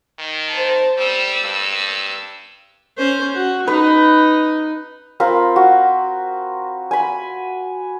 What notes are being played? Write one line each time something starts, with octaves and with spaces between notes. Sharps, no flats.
D#3
C5 A5
G3 E6
G2
C#4 C5
F#4
D#4 B4
C4 F4 A#4 B5
F#4
G#5 B5